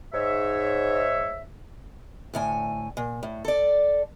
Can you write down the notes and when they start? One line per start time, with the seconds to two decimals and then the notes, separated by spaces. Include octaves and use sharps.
0.13 G#2 C#5 E5
2.34 D2 A2 G#5
2.97 A#2
3.23 A2
3.45 A4 D5